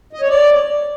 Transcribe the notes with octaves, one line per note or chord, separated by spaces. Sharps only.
D#5
C#5
D5